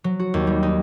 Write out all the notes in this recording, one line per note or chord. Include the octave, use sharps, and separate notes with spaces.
F#3
F#4
D#2
G3
D#4